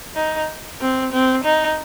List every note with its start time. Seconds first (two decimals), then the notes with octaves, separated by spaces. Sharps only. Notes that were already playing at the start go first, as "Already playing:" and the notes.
0.16 D#4
0.81 C4
1.12 C4
1.44 D#4